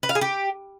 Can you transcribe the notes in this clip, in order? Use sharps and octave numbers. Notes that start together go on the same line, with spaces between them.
B4
F5
G#4
G4